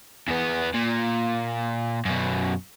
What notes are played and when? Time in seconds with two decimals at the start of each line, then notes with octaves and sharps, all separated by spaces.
0.28 E2 B3
0.74 A#2
2.05 F#2 B2